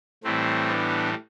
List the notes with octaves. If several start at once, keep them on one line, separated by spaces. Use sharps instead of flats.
A2 E3 G3 A3 C4
B3 D4